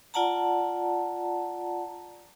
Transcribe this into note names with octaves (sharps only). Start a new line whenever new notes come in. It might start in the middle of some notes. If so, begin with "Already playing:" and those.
F4 D5 F#5 A5 A#5